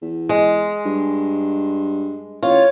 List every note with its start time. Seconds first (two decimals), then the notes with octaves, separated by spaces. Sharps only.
0.02 E2
0.29 G#3
0.85 G2
2.43 A1 F4 C#5